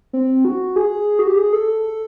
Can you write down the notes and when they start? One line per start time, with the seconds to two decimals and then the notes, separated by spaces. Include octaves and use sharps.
0.13 C4
0.45 F#4
0.76 G#4
1.19 F#4
1.27 G4
1.37 G#4
1.53 A4